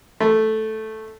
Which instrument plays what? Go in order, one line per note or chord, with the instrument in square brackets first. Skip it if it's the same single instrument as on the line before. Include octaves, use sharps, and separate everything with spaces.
[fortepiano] A3